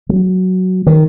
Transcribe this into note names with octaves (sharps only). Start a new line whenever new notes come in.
F#3
D#3